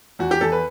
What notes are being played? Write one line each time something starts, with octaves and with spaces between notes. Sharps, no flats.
E2 F#4
G4
E2 A4
B4